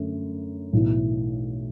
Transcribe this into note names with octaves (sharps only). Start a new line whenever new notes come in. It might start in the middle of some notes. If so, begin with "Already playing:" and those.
Already playing: F#2 D3 A3
B1 A2 E3